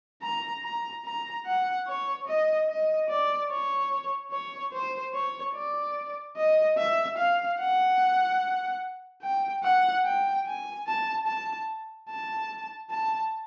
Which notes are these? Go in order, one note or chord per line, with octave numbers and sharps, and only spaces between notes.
A#5
A#5
A#5
F#5
C#5
D#5
D#5
D5
C#5
C#5
C5
C#5
D5
D#5
E5
F5
F#5
G5
F#5
G5
G#5
A5
A5
A5
A5